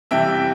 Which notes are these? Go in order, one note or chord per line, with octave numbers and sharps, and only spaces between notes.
F2 C3 E3 G3 E5 G5